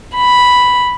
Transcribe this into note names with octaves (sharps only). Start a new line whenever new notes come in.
B5